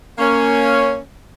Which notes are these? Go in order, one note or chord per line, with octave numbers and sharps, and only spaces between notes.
A#3 C#4